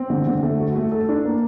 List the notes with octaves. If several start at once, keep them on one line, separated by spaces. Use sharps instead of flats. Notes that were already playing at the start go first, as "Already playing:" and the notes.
Already playing: C4
D3
D3
A3
F#4
A3
A4
D4
A#3